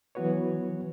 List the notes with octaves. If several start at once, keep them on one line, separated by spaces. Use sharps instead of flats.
E3 F#3 B3 F#4 B4 C#5